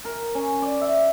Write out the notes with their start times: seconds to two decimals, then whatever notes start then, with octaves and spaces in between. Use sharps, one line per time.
0.05 A#4
0.35 C#4
0.62 D5
0.81 E5